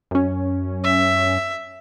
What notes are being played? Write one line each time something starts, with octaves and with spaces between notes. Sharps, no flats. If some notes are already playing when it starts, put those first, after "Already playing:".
F#2 C#4
E5